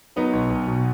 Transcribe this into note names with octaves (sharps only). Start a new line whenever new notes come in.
F#3 B3 D#4
B1
B1
B2